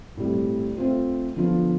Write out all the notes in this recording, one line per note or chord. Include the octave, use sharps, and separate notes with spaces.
A2 G3 C4
A3 C4 F4 C5
D3 F3 B3 D4 F4